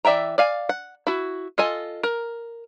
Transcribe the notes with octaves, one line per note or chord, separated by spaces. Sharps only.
E3 D5 E5 G5 A#5
D5 F5 G#5
F#5
E4 F#4
F4 A4 D#5 G#5
A#4